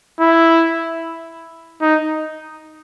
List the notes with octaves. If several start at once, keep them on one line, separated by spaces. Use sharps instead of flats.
E4
D#4